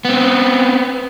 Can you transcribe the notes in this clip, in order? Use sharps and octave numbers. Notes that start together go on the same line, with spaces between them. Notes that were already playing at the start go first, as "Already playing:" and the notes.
B3 C4